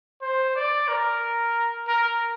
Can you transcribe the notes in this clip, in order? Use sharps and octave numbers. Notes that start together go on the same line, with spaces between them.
C5
D5
A#4
A#4